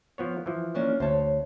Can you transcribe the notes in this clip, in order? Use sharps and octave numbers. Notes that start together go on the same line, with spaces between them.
F3 B3 C#5
E3 F3
A#3 C#4 D4
D2 C5 C#5 A5